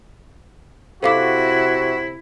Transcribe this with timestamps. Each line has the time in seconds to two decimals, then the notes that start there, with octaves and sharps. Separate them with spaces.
1.03 C3 E4 F#4 A4 F5 D6